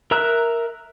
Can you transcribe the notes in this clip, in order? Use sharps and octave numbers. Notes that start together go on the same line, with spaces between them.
A#4 E5 A#5 E6 F#6